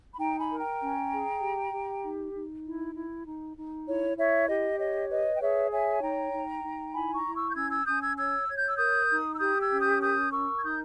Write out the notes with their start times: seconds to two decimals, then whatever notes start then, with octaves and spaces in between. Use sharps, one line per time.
0.14 B5
0.19 D#4 G5 A#5
0.39 G#5 B5
0.50 A#4
0.60 G5 A#5
0.80 C#4
1.11 G#4
1.42 G4
1.72 G4
2.03 D#4
2.34 D#4
2.65 E4
2.95 E4
3.26 D#4
3.56 D#4
3.87 E4 C#5
4.18 E4 C#5 E5
4.49 G4 D#5
4.80 C#5 D#5
5.10 B4 D#5
5.36 G5
5.41 G#4 C#5 E5
5.72 C#5 E5 G#5
6.02 D#4 G5 A#5
6.33 D#4
6.64 D#4
6.94 E4 G#5 B5
7.15 A#5 C#6
7.25 E4
7.36 C#6 E6
7.50 G6
7.56 C#4 E6 G#6
7.71 E6 G#6
7.87 C#4 D#6 G6
8.02 E6 G#6
8.17 C#5 E6 G#6
8.48 C#5 G#6
8.58 G6
8.67 E6
8.77 A#4 D#6 G6
9.09 D#4
9.34 E6
9.40 G4 D#6 G6
9.61 E6 G#6
9.71 C#4
9.81 D#6 G6
10.02 A#4 D#6 G6
10.32 A#4 C#6 E6
10.57 G#6
10.63 D#4 D#6 G6